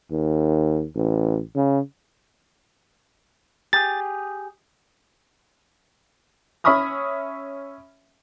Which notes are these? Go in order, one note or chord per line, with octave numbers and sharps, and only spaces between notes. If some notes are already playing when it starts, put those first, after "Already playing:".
D#2
A1
C#3
G4 G#4 A6
C#4 E5 B5 C#6 D#6 F6